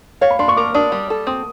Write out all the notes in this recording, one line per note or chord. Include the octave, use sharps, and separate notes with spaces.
C#5 F5
B5
D4 C6
C#6
A#4 D6
D4 D#6
G3
A4
C4 D#6